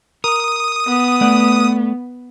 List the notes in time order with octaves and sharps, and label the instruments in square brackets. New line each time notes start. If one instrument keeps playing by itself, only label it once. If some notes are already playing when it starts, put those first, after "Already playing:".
[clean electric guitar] A#4 [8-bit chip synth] D#6
[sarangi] B3
[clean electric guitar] A3 D5 F#5